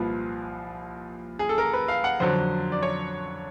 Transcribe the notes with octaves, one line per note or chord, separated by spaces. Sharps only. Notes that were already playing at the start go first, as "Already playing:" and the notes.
Already playing: C2 A#2 F3 B4
G#4
A4
A#4
B4
F5
F#5
F2 D3 F#3 C5
D5
C#5